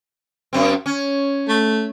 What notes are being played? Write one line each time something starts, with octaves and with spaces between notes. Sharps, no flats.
F#2 C4
C#4
A3